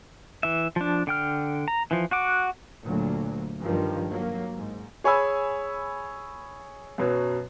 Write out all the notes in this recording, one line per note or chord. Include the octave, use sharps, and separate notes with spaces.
E3 E5
F3 D4
D3 G5 F6
A#5
E3 F3
F#4 F#5 D6
D2 A#2 F#3
G2 D#3 F3 G3
F#3 A#3
G#2
G#4 C#5 G#5 B5 E6
F#2 B2 F#3